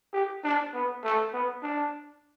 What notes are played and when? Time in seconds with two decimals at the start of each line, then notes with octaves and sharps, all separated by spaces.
0.13 G4
0.44 D4
0.74 B3
1.04 A3
1.33 B3
1.63 D4